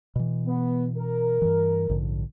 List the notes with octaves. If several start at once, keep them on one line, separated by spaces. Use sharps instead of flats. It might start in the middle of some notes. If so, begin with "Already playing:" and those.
B2 E3
B3
A#4
G2 E3
A#1 G#2 D3